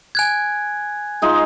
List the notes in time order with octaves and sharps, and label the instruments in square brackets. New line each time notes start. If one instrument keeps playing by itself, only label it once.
[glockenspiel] G#5 F#6 G#6
[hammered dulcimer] G#3 D#4 F4